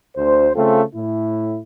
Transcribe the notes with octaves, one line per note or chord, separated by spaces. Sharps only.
D2 C5
C#3 A3 C4 F4 A4
A2 E4